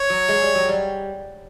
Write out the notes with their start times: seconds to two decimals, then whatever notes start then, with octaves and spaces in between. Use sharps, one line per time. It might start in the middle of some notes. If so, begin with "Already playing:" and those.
Already playing: C#5
0.10 F#3
0.29 G#3
0.42 G3
0.55 F#3
0.69 G3